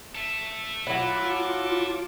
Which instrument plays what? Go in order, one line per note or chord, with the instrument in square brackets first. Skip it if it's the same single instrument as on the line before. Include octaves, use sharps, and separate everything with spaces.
[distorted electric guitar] A4 E5
[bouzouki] F#3 E4 [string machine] F4 D6